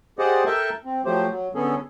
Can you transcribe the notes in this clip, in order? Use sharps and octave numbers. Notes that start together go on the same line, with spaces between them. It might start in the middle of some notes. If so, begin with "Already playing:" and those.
G4 G#4 C5 D5 D#5 F#5
A4 A#4 E5 G5 A5
C4
F3 F#3 A3 G4 C5
F#3
D3 B3 C#4 G#4 A4